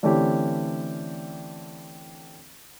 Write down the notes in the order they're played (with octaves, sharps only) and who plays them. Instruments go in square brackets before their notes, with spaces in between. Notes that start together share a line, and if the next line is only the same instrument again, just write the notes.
[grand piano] D3 E3 A3 C4 C#4 G4